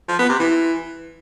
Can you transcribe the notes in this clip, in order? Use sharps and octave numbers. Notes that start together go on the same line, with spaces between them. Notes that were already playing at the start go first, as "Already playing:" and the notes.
F3
B3
C3
E3